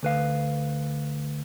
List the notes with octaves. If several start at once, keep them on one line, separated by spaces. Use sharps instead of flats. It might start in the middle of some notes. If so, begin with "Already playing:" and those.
D2 B4 F5